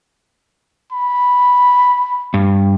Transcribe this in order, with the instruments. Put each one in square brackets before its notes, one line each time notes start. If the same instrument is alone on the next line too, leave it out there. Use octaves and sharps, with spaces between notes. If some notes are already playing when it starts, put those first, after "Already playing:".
[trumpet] B5
[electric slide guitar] G2